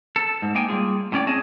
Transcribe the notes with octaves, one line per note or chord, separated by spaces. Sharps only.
A4
G#2
A#3 D#4 G5 G#5
G3 G#3 A#3 F4 G#4
A2 C#4 D5 G5
C4 C#4 G#4 D#5 A5